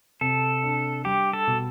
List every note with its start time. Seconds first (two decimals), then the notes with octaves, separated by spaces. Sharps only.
0.21 C3 A4
0.64 D4
1.05 G3 G4
1.33 A4
1.47 B2